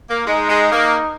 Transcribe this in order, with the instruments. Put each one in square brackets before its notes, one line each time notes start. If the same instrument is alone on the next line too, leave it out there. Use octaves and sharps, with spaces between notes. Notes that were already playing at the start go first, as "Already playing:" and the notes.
[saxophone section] A#3
[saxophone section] G#3 [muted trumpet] D#4
[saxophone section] G#3
A#3